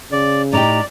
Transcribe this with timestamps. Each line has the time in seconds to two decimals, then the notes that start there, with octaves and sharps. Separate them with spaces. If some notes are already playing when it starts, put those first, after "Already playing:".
0.12 C#3 D5
0.53 A2 D#4 G4 D5 A#5